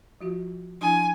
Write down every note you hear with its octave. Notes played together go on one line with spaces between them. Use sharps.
F3 F4 F#4
F3 D4 E4 G#5